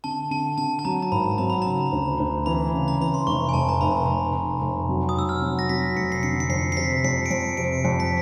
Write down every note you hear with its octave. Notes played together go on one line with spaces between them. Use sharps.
D3 A5
D3 A5
D3 A5
A5
F#3 A#5
A#5
G#1 B5
F#3 A#5
B5
C#3 A#5
D2
D2
E3 B5
C#3
A#5
E3 B5
C6
F1 C#6
G#5
F1 A5
A#5
F1 B5
F1
F1
F1
F#3
D#6
F1 E6
F6
F#3
A#6
F#3 B6
F1 C#7
C7
D3 C#7
C#7
F2 C7
C7
C3 B6
F2 C#7
D7
F2 C#7
C3 D7
F2 C#7
B6